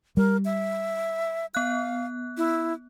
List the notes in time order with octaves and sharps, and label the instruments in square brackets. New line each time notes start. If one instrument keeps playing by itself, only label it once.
[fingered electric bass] G3 [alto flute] A#4
[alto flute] E5
[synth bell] B3 F#6 [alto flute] F5
[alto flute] E4